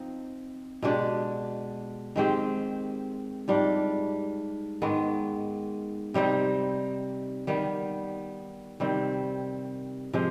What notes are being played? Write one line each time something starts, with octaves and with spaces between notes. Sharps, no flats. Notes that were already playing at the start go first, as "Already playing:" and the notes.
Already playing: F3 C4 D#4
B2 G#3 D4 G4
D#3 G#3 C4 G4
G#2 G3 D4 F4
G#2 D#3 G#3 B3
C3 G3 C4 D#4
D#3 G3 B3
C3 D#3 G3 C4
C3 F3 G#3